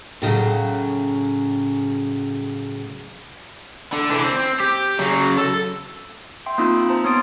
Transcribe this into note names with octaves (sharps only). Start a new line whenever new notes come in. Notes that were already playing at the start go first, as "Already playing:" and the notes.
A2 C#3 F3 F#3
D3
E3 D4
C4
G4
C#3 F#3
A4
E5 G5 C6
A#3 C4 D#4 F4 B5 E6
C5 A5 A#5
B3 C#5 C6 D#6 A6 D7